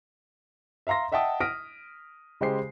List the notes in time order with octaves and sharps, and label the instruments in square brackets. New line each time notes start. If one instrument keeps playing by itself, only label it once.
[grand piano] E5 F5 A#5 C6 A#6
D#5 E5 F#5 G5 A5 D#6
D#6 F6 A#6 B6 D7 D#7
C#3 G#3 G4 C5 C7